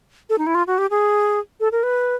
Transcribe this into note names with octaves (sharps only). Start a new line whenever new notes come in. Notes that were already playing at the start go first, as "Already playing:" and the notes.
A4
D#4
E4
F4
F#4
G4
G#4
A4
A#4
B4